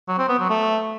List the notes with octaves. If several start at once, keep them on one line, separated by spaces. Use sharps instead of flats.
F#3
C4
B3
F#3
A3